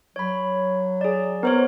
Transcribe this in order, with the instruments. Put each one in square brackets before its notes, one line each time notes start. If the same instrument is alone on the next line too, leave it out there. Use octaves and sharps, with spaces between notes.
[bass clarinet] F#3 [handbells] C#5 B5
[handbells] G#4 D5
[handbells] B3 C5 C#5 [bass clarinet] A#4